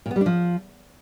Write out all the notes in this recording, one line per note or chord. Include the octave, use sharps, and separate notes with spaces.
A#2
B3
G3
D4
F3